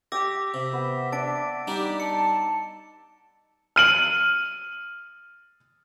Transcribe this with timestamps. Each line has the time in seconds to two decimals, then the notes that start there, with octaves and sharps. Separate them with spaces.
0.12 G4 G5 D6 E6 A#6
0.54 C3 E5
0.73 B3
1.12 D4 A6 D7
1.67 G3 D4 D#4 G4 D5
2.00 A5 C#7
3.76 F6 D#7 F#7